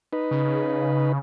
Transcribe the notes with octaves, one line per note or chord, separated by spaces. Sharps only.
D#4 B4
C#3